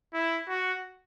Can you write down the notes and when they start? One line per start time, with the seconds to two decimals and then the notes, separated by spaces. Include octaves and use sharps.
0.14 E4
0.48 F#4